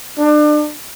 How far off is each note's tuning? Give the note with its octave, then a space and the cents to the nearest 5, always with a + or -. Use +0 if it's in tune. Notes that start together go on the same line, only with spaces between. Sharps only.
D4 +35